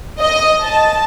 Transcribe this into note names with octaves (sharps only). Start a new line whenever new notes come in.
D#5
A5